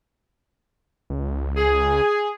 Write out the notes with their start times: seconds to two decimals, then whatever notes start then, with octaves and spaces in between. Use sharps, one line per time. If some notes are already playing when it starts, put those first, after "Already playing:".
1.10 C#2
1.57 G#4